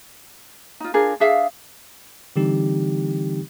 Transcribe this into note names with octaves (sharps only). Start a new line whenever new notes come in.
D#4 F4
D4 F4 G#4 A#4
D4 G#4 E5 F5
D3 E3 G3 C4 D#4 G4